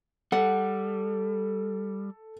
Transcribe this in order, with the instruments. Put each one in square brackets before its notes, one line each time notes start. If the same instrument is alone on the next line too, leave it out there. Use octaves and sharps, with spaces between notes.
[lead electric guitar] G3 [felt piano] A4 [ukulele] F#5